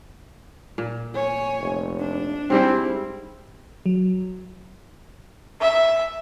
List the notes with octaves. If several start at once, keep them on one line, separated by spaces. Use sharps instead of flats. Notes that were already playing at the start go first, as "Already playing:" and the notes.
A#2
C#5 G#5
F1
D4
G#2 G3 C4 E4
F#3
E5